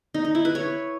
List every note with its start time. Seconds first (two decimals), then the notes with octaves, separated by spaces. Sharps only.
0.14 D#4
0.25 D#4
0.35 E4
0.45 B4
0.55 C#5